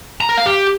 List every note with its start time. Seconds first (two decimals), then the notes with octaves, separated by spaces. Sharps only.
0.21 A#5
0.29 A#4
0.38 F5
0.46 G4